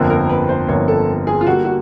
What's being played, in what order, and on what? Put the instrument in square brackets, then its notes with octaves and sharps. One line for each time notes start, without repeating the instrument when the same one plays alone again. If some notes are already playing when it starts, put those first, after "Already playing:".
Already playing: [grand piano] G1 F2 D3 F3 A#3
[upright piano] A#4
B4
C5
[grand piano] G1 F2 D3 F3 A#3 [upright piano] C#5
[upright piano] A4
G#4
F4
[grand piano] D3 G3 A#3 [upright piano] F#4
[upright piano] F#4